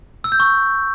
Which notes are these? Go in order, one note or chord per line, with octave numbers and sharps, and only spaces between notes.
E6
G6
C#6